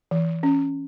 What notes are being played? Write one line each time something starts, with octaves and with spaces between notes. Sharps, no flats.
E3
C#4